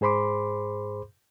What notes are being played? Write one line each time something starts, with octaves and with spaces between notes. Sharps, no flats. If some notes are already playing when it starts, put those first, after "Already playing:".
G#2 G#4 C5 B5 C6 D6